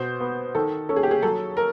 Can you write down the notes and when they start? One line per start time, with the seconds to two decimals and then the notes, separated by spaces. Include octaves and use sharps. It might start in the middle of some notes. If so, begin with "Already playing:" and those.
Already playing: B2 C5
0.20 B3
0.55 D#3 A4
0.89 C#4 A4
0.96 G#4
1.03 G4
1.11 G#4
1.22 F#3 A4
1.57 A#4